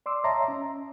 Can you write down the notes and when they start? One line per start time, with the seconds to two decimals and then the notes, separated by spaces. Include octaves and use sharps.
0.06 D5 C6 D6 E6
0.24 C#5 D#5 E5 A5 A#5 C6
0.48 C#4